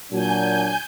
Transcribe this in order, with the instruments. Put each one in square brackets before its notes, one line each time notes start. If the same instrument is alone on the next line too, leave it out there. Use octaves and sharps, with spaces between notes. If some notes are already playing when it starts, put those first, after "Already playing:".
[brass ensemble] A#2 F#3 D4 [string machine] G#5 G6